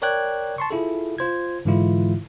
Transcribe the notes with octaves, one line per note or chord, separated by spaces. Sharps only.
A#4 C#5 D5 G5 F#6 G#6
A5 C6 C#6
E4 F4 G#4 A4
F4 C5 G#6
G#2 D3 E3 G#3 E4 F4